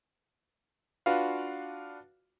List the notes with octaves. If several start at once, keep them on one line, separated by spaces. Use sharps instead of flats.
D4 F4 F#4 B4 F5